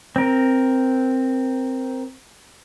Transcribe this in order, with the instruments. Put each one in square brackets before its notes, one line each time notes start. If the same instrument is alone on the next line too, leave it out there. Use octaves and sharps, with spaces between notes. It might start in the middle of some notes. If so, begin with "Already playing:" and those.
[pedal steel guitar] C4 A#4